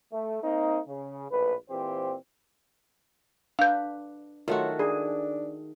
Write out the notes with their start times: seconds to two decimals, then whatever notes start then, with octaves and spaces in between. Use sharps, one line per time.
0.12 A3
0.43 A#3 C4 D#4
0.88 C#3
1.31 A#1 A2 B4
1.70 A#2 E3 C4 G4 C5
3.59 D4 B4 F5 G6
4.48 D#3 F#3 A3 F4 F#4
4.79 D4 G#4